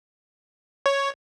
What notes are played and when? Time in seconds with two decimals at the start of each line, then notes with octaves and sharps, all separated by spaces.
0.86 C#5